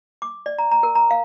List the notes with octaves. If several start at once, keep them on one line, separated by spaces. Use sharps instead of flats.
D6
D5
A#5
A#5
A#4
A#5
F5